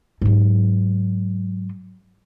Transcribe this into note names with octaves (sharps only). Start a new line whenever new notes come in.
G#2 F#3